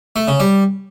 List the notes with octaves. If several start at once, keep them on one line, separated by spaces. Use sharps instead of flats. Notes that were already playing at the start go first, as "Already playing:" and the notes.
A3
C#3
G3